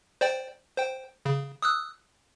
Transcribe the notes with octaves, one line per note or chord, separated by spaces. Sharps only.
C5 D5 G5
C5 G5
C#3
D#6 E6 F#6